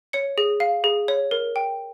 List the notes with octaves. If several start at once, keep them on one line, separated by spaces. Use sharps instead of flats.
C#5 C#7
G#4
F5
G#4
C#5
A#4
G5